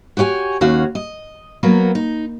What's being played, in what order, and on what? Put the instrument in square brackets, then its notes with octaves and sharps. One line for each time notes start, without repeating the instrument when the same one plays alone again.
[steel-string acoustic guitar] F#4 G4 C#5 F#5 G#5
D#2 C#4 F#4 F5
D#5
F#3 A#3 B3
D#4